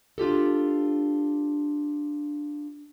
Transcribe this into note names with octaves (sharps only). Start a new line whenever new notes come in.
D4 F4 G4 A4